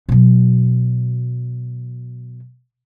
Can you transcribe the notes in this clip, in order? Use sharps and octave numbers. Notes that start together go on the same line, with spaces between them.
B2 F#3